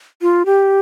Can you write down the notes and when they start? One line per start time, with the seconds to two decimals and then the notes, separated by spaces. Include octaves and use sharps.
0.22 F4
0.46 G4